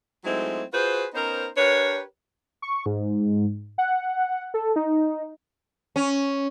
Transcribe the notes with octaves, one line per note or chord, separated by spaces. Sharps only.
F#3 G#3 A3 C4 D#4 E4
F4 F#4 G#4 B4 C5
B3 C#4 D#4 A#4 C5
D4 G4 A#4 B4 C#5
C#6
G#2
F#5
A4
D#4
C#4